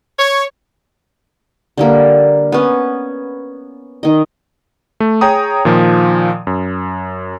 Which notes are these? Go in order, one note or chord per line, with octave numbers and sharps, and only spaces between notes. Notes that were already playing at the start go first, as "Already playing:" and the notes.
C#5
D3 G3 A#3
B3 C#4
D#3 D#5
A3
G#4 C#5 G5 A#5 D#6
A#2 D#3 F3
F#2